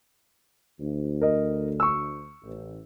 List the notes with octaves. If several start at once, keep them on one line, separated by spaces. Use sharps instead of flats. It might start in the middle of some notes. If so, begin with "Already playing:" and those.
D2
A#4 D#5
C#6 E6
A1